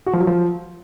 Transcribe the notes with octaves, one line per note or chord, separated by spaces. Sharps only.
F#4
F3
F#3
F3